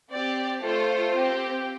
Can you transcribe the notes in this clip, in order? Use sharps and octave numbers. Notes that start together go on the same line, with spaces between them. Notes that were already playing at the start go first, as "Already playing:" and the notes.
C4 G4 D5
A3 F4 A4 C5
C4 G4